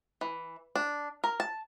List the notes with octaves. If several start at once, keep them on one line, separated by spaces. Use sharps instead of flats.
E3
D4
A#4
A5